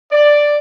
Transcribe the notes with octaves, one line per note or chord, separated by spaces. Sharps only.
D5